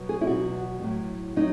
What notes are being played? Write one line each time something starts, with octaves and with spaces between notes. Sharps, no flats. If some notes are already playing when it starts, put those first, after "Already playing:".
Already playing: B2 F#3
G#4
E4
E2 B2 F#3 F#4
A2 F#3
F#3 D#4